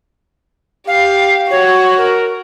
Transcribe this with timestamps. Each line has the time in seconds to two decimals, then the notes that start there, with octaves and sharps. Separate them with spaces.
0.87 G4 F5
1.51 F#4 C#5
1.98 A#4